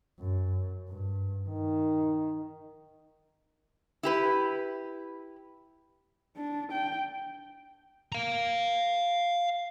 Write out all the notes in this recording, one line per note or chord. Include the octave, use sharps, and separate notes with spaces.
F#2
G2
D#3
E4 G4 B4
D4
G5
F5 A#5